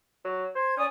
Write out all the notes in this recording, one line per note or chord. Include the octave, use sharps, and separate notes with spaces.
F#3
C5 G#6
C#4 D5 G#5 D#6